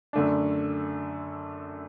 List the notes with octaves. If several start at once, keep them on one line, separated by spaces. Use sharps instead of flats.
F#2 D3 A3 D4